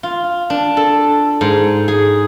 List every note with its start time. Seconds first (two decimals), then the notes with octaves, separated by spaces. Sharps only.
0.03 F4
0.50 D4
0.77 A4
1.41 G#2
1.88 G#4